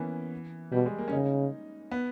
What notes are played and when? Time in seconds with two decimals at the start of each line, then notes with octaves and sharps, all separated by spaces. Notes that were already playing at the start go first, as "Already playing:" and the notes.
Already playing: E3 A#3 B3 C#4
0.72 B2 G3
0.86 G#3
0.98 A#3
1.08 C#4
1.12 C#3 D#4
1.92 B3